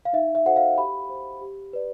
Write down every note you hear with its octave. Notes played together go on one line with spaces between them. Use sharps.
F5
D#4 E5
E5
F#4 A4 C5 F#5
F5
G4 B5
C5
G4
B4 D5